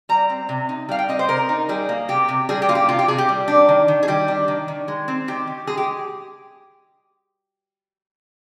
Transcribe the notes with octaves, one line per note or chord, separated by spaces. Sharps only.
G3 A#5
C4
C3
D#4
G3 F5
G5
C4 D#5
C5
C3 A#4
D#4
G3 G#4
A#3
C3 G4
C3
G3 G#4
G4
A#3 F4
G4
C3 F4
G4
C3 G#4
G4
G3
D4
D#3
D#3
G#4
G3 G4
D4
D#3
D#3
G#3
C4
D#3 G4
D#3
G#3 G#4
G4